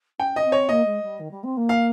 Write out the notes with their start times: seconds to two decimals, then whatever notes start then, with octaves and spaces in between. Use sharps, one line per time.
0.19 C#4 G5
0.36 D#5
0.45 C4
0.52 C#5
0.69 A#3 D#5
0.85 G#3
1.02 G3
1.20 D#3
1.31 G3
1.43 C4
1.57 A#3
1.69 F5